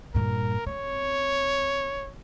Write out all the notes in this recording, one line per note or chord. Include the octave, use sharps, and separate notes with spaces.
G2 A#2 A#4
C4 C#5